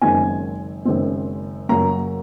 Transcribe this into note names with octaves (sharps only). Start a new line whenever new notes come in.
F#1 F#2 D#3 G#3 C4 G#5
F#1 F#2 D#3 G#3 C4
F#2 C#3 F#3 A#3 A#5